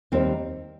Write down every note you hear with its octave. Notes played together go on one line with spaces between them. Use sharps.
D#2 D#3 G3 C4